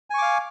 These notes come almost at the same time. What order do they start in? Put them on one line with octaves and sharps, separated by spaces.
G#5 C#6 D6 F5